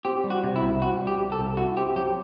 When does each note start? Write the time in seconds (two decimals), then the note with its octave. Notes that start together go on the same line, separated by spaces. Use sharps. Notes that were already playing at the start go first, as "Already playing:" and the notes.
0.05 C4 G4
0.24 G3
0.30 F#4
0.44 C3
0.56 E4
0.62 C2
0.81 C4 F#4
1.01 G3
1.07 G4
1.19 C3
1.32 A4
1.39 C2
1.57 E4 F#4
1.77 C4 G4
1.96 F#3 G4